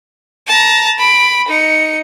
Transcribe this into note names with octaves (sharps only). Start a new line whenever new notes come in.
A5 A#5
B5 D7
D#4 C#7